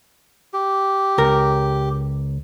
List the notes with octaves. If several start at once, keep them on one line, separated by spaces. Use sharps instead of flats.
G4
C#2 A#4